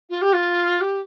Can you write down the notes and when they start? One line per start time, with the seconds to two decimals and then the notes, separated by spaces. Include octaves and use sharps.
0.09 F4
0.21 G4
0.33 F4
0.80 G4